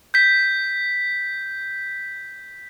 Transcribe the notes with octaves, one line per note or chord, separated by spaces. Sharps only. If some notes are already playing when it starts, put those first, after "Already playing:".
G6 B6